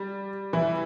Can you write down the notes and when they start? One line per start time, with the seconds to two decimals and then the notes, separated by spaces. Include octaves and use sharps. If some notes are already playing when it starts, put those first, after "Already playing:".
Already playing: G3
0.53 E3 E4